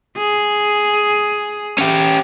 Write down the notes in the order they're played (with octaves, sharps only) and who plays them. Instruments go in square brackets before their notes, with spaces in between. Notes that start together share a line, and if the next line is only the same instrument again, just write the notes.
[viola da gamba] G#4
[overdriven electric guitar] C#4 G4